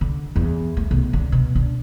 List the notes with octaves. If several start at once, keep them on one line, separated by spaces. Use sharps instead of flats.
D3
E2
A3
B1
D3
B2
D4